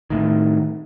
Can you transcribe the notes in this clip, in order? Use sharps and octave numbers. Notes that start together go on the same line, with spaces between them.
A2 D#3